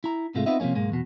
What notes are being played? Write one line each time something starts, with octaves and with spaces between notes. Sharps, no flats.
E4 A#5
G#2 C3 G#3 A3 F4
B3 C4 D#4 F4 D#5 E5
C3 F3 F#3 A#3 C#4
B1 G#2 G#3 A#3
E2 B2